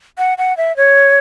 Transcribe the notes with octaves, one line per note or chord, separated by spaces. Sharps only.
F#5
F#5
E5
C#5